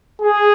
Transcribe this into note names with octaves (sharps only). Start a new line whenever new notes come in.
G#4